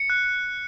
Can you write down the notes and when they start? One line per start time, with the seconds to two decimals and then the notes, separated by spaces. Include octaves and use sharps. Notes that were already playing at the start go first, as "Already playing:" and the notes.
Already playing: C#7
0.10 F#6